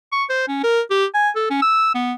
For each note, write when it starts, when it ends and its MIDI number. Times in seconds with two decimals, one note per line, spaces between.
0.12 0.24 85
0.29 0.45 72
0.48 0.62 61
0.63 0.80 70
0.91 1.05 67
1.14 1.29 80
1.36 1.49 69
1.50 1.59 61
1.62 1.92 88
1.94 2.13 59